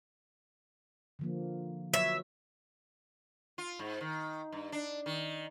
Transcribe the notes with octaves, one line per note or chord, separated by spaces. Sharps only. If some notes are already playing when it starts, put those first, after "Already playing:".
D3 F3 A#3
F#3 B4 C#5 E5
F4
G#2
D#3
G2
D4
D#3